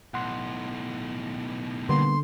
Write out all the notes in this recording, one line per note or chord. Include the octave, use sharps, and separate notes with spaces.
B1 A2 F#5 C6
D3 G3 A#3 B3 C6